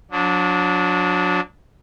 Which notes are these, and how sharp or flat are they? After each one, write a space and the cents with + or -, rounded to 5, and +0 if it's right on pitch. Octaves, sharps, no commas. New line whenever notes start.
F#3 -40 D4 -15